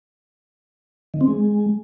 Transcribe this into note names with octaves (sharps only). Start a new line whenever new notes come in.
D#3
C4
G#3